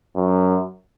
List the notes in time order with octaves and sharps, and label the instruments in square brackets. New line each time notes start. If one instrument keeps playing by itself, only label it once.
[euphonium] F#2